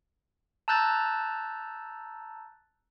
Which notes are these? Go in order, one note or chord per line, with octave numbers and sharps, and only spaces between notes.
A5 A#5 E6 F#6 G6 A6